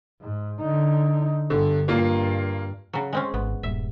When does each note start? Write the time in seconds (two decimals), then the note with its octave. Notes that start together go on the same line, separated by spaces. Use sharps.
0.21 G#2
0.60 D3 D#4
1.50 G1 D3
1.88 G2 A#3 F4
2.93 C#3 F#3
3.13 G#3 C4 C#4
3.34 G#1 B3
3.63 D#1 G2 E5